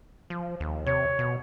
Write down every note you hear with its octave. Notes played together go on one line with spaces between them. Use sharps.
F3
D#2
C3 C#5
B2